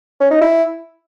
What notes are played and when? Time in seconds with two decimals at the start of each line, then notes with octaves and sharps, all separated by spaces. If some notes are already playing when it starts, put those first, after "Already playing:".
0.20 C#4
0.31 D#4
0.41 E4